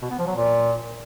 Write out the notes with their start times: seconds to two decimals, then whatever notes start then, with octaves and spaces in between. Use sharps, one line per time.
0.02 B2
0.10 B3
0.19 F3
0.27 F#3
0.35 A#2